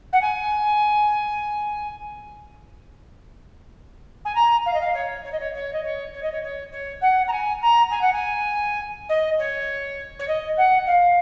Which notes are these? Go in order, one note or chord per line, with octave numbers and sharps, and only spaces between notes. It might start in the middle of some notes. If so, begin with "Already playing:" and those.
F#5
G#5
G#5
A#5
F5
D#5
F5
C#5
C#5
D#5
C#5
C#5
D#5
C#5
C#5
D#5
C#5
C#5
C#5
F#5
A#5
G#5
A#5
G#5
F#5
G#5
D#5
C#5
C#5
D#5
F#5
F5